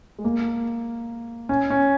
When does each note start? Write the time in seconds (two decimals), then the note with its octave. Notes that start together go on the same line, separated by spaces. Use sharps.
0.18 G#3
0.24 A#3
1.49 C#4
1.70 C#4